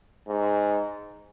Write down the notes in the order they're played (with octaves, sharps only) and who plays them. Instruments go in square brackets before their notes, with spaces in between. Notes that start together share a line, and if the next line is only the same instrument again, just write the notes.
[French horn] G#2